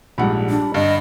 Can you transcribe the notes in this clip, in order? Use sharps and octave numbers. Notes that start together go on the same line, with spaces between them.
A#1 G#2 G3 F#5 B5
D4
G2 D3 D#5